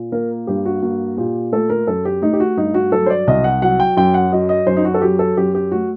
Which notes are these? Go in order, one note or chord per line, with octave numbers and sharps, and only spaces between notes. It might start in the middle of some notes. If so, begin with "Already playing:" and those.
Already playing: A#2
A#3 A#4
G2 G4
F#4
A#3 F#4
A#2 G4
A3 A4
A#4
F#2 A4
G4
A3 D#4
G4
F#4
G2 D#4
F#4
F#3 A4
C5
D5
C2 D#5
F#5
F#3 F#5
G5
F#2 G5
F#5
F#3 D#5
D#5
F#2 C5
D#4
F#4
A4
F#3 G4
A4
F#2 G4
G4
A3 F#4